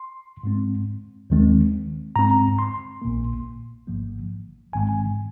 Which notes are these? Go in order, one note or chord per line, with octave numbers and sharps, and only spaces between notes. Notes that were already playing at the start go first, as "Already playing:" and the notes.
Already playing: C6
G#2 G#3 C4
D#2 D#3 G#3 C4
G#2 G#3 C4 A#5
C6
A#1 A#2 A#3
G#1 G#2 F3 A#3
G#1 G#2 D#3 G#3 C4 G#5